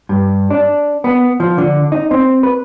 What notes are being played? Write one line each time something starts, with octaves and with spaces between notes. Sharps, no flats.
G2
D4
B3
F3
D3
D#4
C4
B4